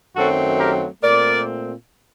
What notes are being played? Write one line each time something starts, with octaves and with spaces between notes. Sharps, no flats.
F#2 D#3 F#3 A3 C4 F#4 A4
G4 A#4
A#2 A3 C4 A#4 D5